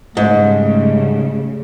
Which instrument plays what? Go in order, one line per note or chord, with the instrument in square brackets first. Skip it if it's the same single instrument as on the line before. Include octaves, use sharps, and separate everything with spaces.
[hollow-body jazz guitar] G#2 [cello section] C#3 G3 A3